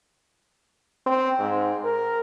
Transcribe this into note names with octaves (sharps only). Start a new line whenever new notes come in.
C4
G#2
A#4